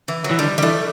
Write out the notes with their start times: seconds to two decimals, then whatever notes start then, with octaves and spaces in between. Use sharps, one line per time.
0.08 E3
0.24 F#3
0.31 E3
0.39 D3 G3
0.58 G3
0.63 E3 A3